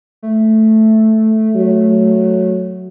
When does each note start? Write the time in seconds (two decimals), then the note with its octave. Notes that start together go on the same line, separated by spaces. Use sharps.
0.23 A3
1.55 F#3